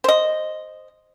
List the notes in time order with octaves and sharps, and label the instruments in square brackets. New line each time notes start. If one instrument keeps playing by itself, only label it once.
[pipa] C5 D#5